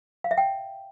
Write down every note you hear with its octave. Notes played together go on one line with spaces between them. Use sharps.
F5
E5
G5